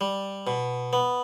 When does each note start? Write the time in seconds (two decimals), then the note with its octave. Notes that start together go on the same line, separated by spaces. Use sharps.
0.01 G3
0.47 B2
0.93 B3